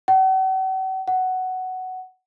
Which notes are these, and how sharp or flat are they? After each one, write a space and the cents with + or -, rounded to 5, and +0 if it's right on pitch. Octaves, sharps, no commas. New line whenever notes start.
F#5 +45
F#5 +10